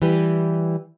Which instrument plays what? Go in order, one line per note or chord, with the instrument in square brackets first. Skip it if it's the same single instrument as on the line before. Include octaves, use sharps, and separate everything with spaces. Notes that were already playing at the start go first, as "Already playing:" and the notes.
[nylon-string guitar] E3 G3 G4 B4